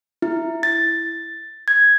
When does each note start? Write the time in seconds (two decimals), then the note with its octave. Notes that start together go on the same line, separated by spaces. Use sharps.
0.22 E4
0.63 A6
1.68 G#6